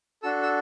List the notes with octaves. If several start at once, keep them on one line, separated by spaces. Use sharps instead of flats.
D4 F#4 A4 E6
E6